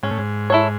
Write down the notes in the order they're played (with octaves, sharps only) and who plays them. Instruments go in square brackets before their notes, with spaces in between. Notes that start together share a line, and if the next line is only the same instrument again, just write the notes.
[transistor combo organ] G#2 [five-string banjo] C#4
[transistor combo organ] A2
G#2
[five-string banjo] E4 A4 C#5